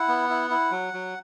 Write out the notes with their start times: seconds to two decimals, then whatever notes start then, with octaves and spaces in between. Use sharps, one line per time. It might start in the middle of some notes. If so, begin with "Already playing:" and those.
Already playing: E4 F#5
0.08 B3
0.30 E4
0.50 E4
0.71 F#3
0.94 F#3